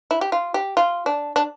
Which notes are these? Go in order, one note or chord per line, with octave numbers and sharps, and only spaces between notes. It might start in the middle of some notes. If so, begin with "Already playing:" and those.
E4
G4
F4
G4
F4
D4
D4